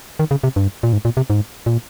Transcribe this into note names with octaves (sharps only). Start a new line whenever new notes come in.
D#3
C#3
C3
G2
A#2
G#2
A#2
C3
G#2
A#2